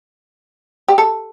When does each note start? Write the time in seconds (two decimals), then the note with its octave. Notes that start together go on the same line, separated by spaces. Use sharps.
0.88 G4
0.98 A4